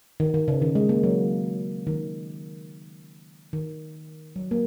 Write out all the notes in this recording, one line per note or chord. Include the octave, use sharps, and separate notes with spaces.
D#3
D#3
C#3
D#3
G#3
A#3
F#3
D#3
D#3
F#3
A#3